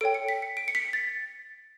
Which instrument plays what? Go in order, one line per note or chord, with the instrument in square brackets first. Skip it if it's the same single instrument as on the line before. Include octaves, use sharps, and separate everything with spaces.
[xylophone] A4 C#5 G5 D7
C#7
B6
C#7
D7
C#7
B6
A6